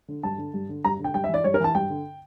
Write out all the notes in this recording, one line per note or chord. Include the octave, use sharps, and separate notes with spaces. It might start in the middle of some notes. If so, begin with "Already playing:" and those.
D3
G2 A5
D3
G2
D3
G2 A#5
D3 G5
G2 G5
E5
E3 D5
G2 C#5
A#4
E3 A5
G2 G5
D3